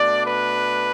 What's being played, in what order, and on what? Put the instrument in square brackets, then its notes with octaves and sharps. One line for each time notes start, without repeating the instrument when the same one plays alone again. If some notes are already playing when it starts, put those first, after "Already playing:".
Already playing: [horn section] B2 A3 D4 D5
B4